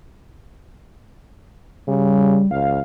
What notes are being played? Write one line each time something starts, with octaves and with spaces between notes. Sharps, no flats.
C#3 G3
C#2 F5